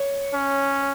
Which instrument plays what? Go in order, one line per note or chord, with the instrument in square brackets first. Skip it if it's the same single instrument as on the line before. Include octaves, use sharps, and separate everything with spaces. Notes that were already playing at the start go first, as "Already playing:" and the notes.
Already playing: [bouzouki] C#5
[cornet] C#4